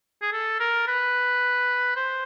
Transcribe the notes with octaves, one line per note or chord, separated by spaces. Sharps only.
G#4
A4
A#4
B4
C5